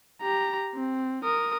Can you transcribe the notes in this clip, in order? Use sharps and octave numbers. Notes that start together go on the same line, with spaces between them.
G4 A#5
C4
A#4 D#6